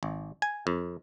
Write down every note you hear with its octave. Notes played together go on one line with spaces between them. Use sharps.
G#1
G#5
F2